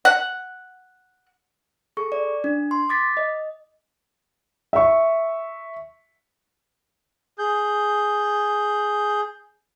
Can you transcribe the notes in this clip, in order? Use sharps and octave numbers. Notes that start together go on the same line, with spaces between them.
F#5
G#4 A4 C#6
D5
D4
C6
D6 A6 B6
D#5
E5 C#6
G#4 G6